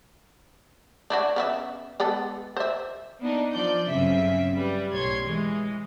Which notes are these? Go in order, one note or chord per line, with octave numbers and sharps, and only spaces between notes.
D4 E4 F#4
C#3 B3 E5
G#3 B3 A4
C5 E5
A#3 B3 D4 D#4
F3 D5 G6
G1 F#2 C#3 C4 E5 B6
G3 B4
B1 A2 C#5 C6 G#6
E3 G#3